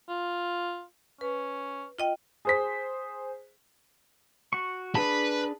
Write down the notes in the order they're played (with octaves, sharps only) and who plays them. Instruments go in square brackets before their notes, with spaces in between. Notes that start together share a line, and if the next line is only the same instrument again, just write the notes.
[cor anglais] F4
[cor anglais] C#4 [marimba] B4
[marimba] F4 D#5 G5
[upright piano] G#4 C5 B6
[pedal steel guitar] F#4 C#6
[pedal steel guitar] D4 G#4 A5 [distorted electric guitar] B4